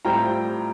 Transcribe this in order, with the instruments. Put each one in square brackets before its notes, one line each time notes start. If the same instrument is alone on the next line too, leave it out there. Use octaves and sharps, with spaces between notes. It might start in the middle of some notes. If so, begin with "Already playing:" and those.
[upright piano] A2 G3 C4 F4 G5 A#5